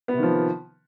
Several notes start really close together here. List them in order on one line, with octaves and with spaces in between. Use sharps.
B3 C3 D#3 F3